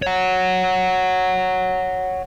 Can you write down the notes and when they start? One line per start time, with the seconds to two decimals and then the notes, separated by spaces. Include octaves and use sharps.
0.02 C#5 F#5